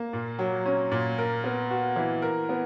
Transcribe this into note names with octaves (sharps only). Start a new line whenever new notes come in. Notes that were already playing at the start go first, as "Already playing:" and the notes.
Already playing: A#3
A#2
F#3
C#4
A#2
A#4
B3
F#4
E3
A#4
B3